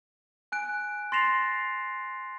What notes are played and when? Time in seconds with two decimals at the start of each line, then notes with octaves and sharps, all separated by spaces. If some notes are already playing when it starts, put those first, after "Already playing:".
0.52 G#5 F#6 D7
1.12 C6 A6 A#6 C7 E7 F7